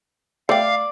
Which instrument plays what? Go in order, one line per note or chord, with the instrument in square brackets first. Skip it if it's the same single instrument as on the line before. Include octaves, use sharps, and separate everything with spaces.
[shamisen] A3 G5 [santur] D5 [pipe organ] F5